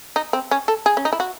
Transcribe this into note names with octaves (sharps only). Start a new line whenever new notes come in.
D#4
C4
C#4
A4
G#4
C#4
D#4
E4
F#4